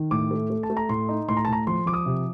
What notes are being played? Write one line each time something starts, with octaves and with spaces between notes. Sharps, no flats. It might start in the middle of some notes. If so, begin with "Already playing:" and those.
Already playing: D#3
A2 D6
A3
A3
A5
A3
A#5
A2 C6
D#4
A2 C6
A#5
A5
A2 A#5
F3 C6
F3 D6
D#6
C3